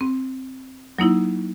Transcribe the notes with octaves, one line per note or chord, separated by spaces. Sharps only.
C4
F#3 A#3 D#4 E4